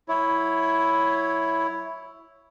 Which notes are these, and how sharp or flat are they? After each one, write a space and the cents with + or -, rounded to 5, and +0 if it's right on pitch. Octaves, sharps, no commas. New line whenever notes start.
F#3 +0 E4 +0 C#5 +0